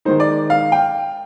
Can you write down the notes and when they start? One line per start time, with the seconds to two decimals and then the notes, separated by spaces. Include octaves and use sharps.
0.05 D#3 G#3 D#4 C5
0.20 D5
0.50 F5
0.72 G5